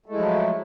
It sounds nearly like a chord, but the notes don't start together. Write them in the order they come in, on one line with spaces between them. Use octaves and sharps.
A3 G#3 E4 F3 F#3